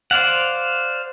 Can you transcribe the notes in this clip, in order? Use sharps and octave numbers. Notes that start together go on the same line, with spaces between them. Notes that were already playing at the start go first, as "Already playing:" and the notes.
C5 D5 F5 F#5